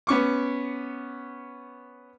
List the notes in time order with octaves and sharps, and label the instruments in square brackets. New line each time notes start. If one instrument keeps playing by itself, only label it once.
[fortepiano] B3 C#4 C#6 D6